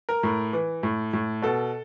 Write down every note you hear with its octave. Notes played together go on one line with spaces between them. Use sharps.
A#4
A2
E3
A2
A2
B2 A4